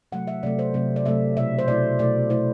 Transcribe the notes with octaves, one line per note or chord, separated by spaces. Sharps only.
C3 F#3 A3 F#5
E5
C3 F#3 A3 D5
C5
C3 F#3 A3
D5
C3 F#3 A3 E5
B2 A3 E4 E5
C5
B2 A3 E4 D5
B2 A3 E4 D5
B2 A3 E4 C5